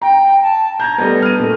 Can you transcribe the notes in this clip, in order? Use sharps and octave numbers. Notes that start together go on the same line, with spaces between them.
G5 A#5
A5
A#5 G6 G#6
G3 A3 B3 D#5
F6 D#7
A#2 A3